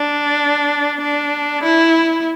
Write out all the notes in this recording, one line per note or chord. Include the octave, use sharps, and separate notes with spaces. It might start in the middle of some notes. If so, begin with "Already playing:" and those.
Already playing: D4
D4
E4